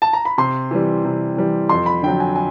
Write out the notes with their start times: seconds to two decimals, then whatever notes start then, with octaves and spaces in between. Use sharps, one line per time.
0.02 A5
0.13 A#5
0.25 B5
0.38 C3 C6
0.71 E3 G3
1.04 C3
1.37 E3 G3
1.69 F2 C6
1.86 B5
2.03 D3 F#3 G5
2.20 G#5
2.36 G#5